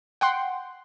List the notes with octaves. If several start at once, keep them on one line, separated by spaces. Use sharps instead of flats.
F#5 G5 C6